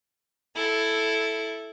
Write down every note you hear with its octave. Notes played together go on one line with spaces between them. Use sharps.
E4 A4